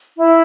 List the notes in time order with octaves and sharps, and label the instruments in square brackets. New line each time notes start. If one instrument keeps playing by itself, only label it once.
[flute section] E4